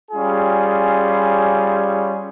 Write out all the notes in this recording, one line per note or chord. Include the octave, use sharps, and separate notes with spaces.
G3 C#4 F4 G#4